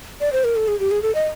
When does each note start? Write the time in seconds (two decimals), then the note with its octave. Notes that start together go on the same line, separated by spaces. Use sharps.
0.21 D5
0.33 C5
0.44 A#4
0.56 A4
0.68 G#4
0.80 G4
0.91 G#4
1.03 A4
1.15 D#5